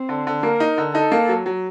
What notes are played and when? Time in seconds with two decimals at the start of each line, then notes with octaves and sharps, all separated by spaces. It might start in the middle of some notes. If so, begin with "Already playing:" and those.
Already playing: C4
0.09 D3
0.27 D3
0.43 A#3 A#4
0.60 D#4
0.78 D3
0.94 D#4 A4
1.12 A#3
1.29 F#3
1.46 F#3